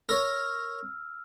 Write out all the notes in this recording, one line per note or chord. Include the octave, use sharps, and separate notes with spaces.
A#4 C#5 E6 F6